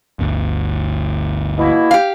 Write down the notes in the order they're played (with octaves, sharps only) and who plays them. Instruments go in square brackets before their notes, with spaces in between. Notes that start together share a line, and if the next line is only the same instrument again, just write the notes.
[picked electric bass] G1 D2
[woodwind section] B2 A#3 E4
[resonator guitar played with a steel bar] G4 F5